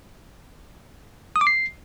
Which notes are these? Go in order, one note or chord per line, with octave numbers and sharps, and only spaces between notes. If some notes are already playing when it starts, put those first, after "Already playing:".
D#6
D6
C7